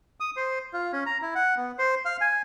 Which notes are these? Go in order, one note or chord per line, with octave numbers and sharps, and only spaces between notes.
D#6
C5
F4
C#4
A#5
E4
F#5
B3
C5
F5
G#5